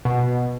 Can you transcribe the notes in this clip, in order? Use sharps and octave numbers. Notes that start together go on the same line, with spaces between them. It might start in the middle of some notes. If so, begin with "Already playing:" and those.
B2